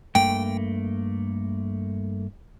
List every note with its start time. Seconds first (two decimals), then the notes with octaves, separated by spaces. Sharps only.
0.15 G2 A3 A#3 G5